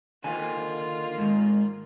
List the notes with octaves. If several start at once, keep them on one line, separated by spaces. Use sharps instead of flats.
D3 D#3 A#3 F4 G#5
G#2 D#3